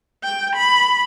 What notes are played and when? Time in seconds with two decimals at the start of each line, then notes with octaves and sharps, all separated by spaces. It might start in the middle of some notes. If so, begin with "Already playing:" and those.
0.24 G5
0.56 B5